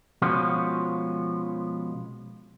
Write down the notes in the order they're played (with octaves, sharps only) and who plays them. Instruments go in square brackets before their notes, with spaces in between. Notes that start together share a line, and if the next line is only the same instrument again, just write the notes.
[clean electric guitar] B2 F3 G#3 B3 C#4 F4